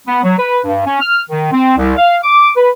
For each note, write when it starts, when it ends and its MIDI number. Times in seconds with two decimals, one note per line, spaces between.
0.07 0.20 59
0.23 0.35 54
0.39 0.59 71
0.64 0.82 43
0.86 0.96 61
1.01 1.21 89
1.30 1.50 51
1.52 1.73 60
1.77 1.93 36
1.96 2.17 77
2.23 2.50 86
2.56 2.70 71